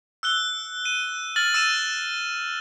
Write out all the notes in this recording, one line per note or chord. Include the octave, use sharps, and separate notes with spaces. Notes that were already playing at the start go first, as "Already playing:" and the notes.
E6 F#6 G7
D#7
F6 A6 F#7
E6 D#7 E7